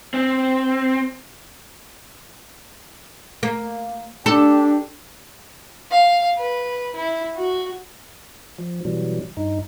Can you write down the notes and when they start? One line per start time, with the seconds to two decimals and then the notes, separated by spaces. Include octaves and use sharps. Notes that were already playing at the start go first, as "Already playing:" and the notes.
0.14 C4
3.43 A#3
4.26 D4 G4 A4
5.91 F5
6.38 B4
6.95 E4
7.36 F#4
8.58 F3
8.85 B2 E3 F#3 G3
9.37 G2 D#4